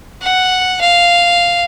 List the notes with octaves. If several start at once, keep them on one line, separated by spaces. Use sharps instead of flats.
F#5
F5